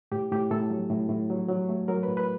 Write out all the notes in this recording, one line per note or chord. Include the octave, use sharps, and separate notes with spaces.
A2 G4
A2 G4
A2 A4
F#3
A2
A2
F#3
F#3
A3
F#3 A#4
A2 B4
B4